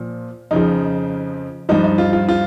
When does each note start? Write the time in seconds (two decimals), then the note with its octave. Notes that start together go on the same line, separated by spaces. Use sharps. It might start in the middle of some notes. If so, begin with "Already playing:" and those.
Already playing: A#2 F3
0.51 F2 C#3 F3 D#4
1.69 G2 F3 D#4
1.84 D#4
1.98 F4
2.13 F4
2.29 F4